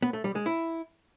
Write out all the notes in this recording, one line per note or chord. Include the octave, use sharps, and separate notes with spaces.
B3
A3
G3
G#3
E4